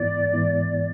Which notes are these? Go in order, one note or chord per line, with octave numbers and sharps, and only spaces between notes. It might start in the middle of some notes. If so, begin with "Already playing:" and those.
Already playing: G#2 E3 B3 E4 D5
G#2 E3 B3 E4